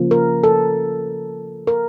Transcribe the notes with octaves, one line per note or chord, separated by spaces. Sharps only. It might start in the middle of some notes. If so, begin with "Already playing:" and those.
Already playing: C#3 F3 A#3
A#4
A4
A#4